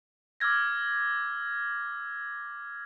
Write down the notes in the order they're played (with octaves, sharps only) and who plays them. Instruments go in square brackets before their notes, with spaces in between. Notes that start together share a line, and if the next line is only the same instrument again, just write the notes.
[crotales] D6 E6 F6 G#6 A#6